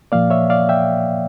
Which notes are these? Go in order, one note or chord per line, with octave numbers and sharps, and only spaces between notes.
A#2 F3 A#3 D5 F5
C#5 E5
D5 F5
E5 G5